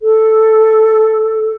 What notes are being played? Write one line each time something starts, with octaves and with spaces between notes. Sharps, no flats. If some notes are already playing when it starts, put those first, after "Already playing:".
A4